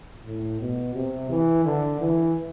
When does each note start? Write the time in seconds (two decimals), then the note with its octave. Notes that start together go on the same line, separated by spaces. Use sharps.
0.25 A2
0.61 B2
0.94 C3
1.30 E3
1.65 D3
2.00 E3